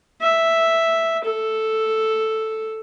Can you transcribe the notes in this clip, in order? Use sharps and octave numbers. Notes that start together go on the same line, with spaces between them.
E5
A4